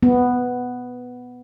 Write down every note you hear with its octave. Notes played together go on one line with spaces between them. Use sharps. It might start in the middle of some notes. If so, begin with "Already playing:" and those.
B3